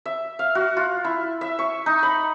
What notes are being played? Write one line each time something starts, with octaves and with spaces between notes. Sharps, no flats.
E5
F5
F#4
F4
E4
E5
C#6
D#4
B5